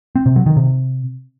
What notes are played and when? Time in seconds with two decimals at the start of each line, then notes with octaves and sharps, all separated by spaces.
0.16 C4
0.26 C3
0.36 F#3
0.46 D#3
0.56 C3